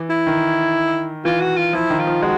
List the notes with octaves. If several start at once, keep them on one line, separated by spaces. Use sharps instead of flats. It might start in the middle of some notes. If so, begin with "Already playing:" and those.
Already playing: E3
E4
D#3
E3 F4
F#4
F4
F3 E4
D#3
F4
F3
G#3 F#4